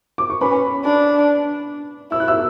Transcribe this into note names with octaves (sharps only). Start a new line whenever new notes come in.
D6
C#6
C#4 B4 B5
D4
E4 E6
F#6
E5 E6